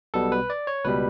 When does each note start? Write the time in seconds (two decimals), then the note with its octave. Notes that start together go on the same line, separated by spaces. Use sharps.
0.14 B1 B2 G3 B3 A4
0.32 B4
0.50 D5
0.67 C#5
0.84 C#2 B2 G3 B4